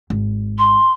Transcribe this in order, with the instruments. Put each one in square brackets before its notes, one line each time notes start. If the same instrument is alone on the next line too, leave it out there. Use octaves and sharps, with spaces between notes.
[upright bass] G#1
[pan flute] C6